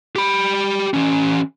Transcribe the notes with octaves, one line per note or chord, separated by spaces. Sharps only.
G4 B5
E3 C#4